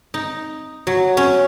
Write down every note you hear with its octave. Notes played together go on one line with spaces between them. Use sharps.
D#4
F#3
C#4